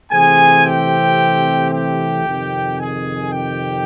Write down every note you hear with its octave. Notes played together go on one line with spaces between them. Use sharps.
C3 E3 A3 C4 G#4 G#5
G4 G5
G4 G5
F2 C3 D#3
G#4 G#5
G4 G5